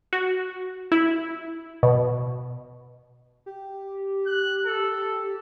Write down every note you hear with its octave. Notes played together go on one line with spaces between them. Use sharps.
F#4
E4
B2
G4
F#6
A4